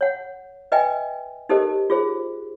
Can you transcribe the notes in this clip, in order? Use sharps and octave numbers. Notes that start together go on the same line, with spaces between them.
C#5 F#5
B4 D#5 E5 G5 G#5
D#4 G4 A4 A#4 C5 D#5
F4 G#4 C5